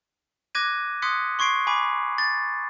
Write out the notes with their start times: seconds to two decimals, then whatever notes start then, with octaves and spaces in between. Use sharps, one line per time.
0.55 D6 F#6 G#6 A#6 D#7
1.02 C6 D#6 F#6 G#6 B6 C#7
1.39 C6 C#6 G#6 C7 D7
1.67 G#5 B5 D6 B6 D#7
2.18 A6